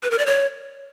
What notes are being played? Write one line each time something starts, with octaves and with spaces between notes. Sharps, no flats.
B4
A#4
D5
C#5